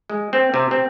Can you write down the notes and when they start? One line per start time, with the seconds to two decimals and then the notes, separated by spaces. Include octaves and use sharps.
0.10 G#3
0.33 C4
0.54 C3
0.71 C4